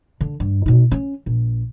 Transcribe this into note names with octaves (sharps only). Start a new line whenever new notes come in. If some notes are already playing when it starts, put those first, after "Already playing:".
D3
G2
B2 D#4
C#4
A#1